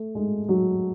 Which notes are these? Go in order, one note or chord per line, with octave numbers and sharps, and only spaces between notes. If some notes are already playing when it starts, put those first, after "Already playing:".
Already playing: A3
G#3
F#3